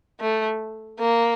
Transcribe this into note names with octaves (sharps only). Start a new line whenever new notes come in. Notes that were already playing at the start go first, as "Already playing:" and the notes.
A3
A#3